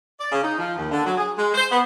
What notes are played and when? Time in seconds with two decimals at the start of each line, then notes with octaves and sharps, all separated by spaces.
0.20 D5
0.32 C#3
0.43 D#4
0.58 F3
0.77 D#2
0.91 D3
1.06 F#3
1.17 G#4
1.38 G#3
1.54 C5
1.72 B3